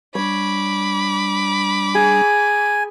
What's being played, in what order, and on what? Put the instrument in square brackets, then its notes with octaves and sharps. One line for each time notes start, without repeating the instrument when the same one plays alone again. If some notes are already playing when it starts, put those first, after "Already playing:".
[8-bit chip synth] G3 D4 [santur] C#5 [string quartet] B5 D6
[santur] G#4 [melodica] G#5